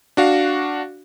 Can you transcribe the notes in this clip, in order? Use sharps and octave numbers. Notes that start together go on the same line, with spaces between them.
D4 F#4 F5